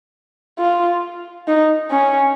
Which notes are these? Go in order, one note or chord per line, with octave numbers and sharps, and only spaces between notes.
F4
D#4
C#4